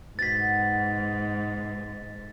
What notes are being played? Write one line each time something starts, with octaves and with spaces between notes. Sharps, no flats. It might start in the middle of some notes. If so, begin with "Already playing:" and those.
G#2 B2 B3 F#5 A6 B6